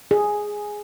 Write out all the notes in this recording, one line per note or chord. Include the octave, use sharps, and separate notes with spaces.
G#4